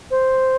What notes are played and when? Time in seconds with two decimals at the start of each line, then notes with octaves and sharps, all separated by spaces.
0.11 C5